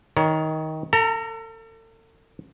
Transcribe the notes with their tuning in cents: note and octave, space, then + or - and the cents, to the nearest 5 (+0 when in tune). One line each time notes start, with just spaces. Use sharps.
D#3 +15 C#5 +25
A4 +40 A#5 +0